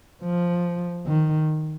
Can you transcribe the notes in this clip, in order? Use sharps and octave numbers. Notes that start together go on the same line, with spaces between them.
F3
D#3